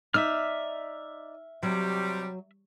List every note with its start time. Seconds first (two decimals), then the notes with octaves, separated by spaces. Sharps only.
0.14 D#4 D5 E5 E6 F6
1.63 C3 F#3 G3